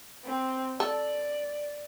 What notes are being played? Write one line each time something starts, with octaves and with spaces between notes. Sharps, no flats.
C4
A4 D5